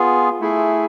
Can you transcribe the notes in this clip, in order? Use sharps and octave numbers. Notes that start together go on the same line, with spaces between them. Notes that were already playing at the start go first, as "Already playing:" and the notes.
Already playing: B3 F4 G#4
A3 E4 G#4